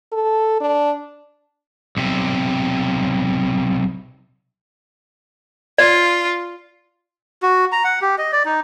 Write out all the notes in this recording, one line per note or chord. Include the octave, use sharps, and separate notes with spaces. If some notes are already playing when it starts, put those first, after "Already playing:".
A4
D4
B1 C3
F4 D5
F#4
A#5
F#5
G4
D#5
D5
D#4